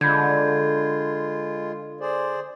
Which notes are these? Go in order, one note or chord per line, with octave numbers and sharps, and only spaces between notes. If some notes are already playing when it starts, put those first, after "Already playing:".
D3 G#3 F4 B5 G6 G#6
G#4 C5 D5